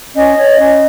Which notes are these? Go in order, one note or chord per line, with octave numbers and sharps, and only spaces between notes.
C#4 D#5
C#5
C#4